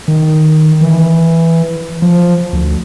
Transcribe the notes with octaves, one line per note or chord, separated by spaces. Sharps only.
D#3
E3
F3
D2